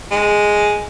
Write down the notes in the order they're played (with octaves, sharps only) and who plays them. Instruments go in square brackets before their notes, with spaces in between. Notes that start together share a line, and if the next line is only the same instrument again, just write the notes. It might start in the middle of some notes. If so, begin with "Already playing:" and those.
[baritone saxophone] G#3